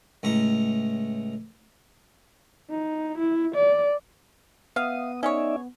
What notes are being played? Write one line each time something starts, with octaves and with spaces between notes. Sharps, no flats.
C#2 A2 A#5
D#4
E4
D5
B3 E5 F5 D#6
C#4 D#4 G#4 C#5 D5 E5